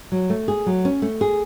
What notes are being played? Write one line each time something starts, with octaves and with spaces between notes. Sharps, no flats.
F#3
A3
G#4
F#3
C#4
A3
G#4